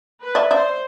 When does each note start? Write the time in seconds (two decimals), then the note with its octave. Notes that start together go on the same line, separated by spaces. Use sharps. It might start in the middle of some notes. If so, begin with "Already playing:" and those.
0.21 B4
0.35 D5 E5
0.51 C5 D5 E5